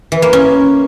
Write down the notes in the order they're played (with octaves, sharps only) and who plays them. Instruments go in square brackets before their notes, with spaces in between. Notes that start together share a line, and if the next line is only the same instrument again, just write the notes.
[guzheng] E3
A#3
C#4